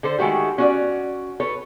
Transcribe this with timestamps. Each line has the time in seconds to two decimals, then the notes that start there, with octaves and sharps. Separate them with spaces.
0.03 D3 A4 C5
0.19 D#3 G#3 A3 F#4 G4
0.58 C#4 F#4 D5
1.40 A4 B4 C#5